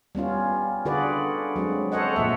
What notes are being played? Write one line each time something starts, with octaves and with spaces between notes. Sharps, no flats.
G3 B3 C#4 F4
D3 F4 F#4 G#4 B4 D5
F#3 G#3 C4
A4 C5 C#5 D#5 F#5
A#2 F3 A#3 E5